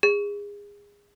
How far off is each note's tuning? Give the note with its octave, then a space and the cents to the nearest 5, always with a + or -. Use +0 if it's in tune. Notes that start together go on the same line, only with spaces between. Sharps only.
G#4 -25